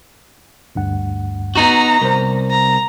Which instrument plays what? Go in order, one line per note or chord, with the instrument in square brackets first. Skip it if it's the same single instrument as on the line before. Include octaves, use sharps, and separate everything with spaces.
[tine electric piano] D2 G2 F#5
[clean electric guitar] B3 D#4 F#4 [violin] A#5
[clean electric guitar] C2 [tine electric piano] A#4 C5
[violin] A#5